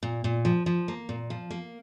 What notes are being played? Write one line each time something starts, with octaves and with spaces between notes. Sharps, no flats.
A#2
A#2
F3
F3
A#3
A#2
F3
A#3